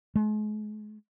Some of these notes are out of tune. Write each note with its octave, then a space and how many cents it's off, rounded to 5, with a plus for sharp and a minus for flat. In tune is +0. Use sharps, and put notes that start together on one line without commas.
G#3 +40